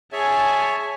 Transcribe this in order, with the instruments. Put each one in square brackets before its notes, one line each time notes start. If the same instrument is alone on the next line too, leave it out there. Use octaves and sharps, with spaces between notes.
[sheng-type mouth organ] G#4 C#5 E5 [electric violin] G#5 A5